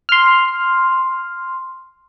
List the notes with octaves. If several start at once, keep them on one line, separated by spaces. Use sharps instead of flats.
C6 F6